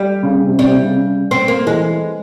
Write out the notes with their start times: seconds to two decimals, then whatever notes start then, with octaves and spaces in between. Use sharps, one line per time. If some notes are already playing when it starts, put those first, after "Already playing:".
Already playing: G3
0.23 C#3
0.35 C#3
0.47 C3
0.59 C3 G3
0.71 C3
0.83 C#3
1.31 C4
1.48 A#3
1.66 E3 G#3